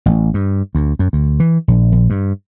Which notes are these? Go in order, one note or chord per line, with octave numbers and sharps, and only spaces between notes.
A1
G2
D2
F#2
D2
E3
A#1
A#1
G2